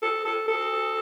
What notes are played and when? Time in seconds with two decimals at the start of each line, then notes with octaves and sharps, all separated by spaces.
0.02 A4
0.25 A4
0.48 A4